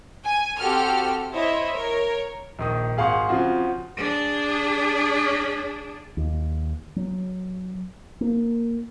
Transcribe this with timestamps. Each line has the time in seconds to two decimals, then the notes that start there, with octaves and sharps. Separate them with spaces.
0.23 G#5
0.57 C4 F#4 G4 A4 F6
1.32 E4 C5 C#5 D#5 E5
1.71 A#4 C#5
2.59 A#1 D#3 D#6
2.97 G#1 G#4 F5 F#5 C6 C#6
3.29 C#3 F3 C4 F4 F#4
3.97 D4 G#4
6.17 D#2
6.96 F#3
8.21 A#3